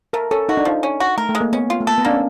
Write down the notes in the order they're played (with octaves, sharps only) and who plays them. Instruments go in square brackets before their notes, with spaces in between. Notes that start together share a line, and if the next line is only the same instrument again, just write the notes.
[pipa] A3 [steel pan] A#4
[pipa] C#4 [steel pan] A4
[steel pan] D#4 [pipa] F#4
[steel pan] D4
[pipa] F3 [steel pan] D#4
[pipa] C#4
F#4
[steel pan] A3 [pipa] A#4
[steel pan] A3
[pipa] G#3
[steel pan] A#3
[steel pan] B3 [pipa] C#4
[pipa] F4
[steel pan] A3
[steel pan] A#3 [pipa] A4
[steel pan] B3
[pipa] A#3 [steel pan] D4
[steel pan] C#4